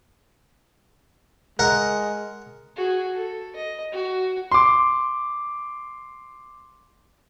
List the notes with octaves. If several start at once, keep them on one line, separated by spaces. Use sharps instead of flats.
G#3 A#4 F#5
F#4 G#4
A4
D#5
F#4
C6 D6